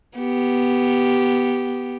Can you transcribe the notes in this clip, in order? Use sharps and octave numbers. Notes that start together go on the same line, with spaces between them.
B3 G4